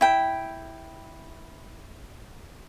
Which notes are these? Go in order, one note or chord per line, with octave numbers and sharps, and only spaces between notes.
E4 G5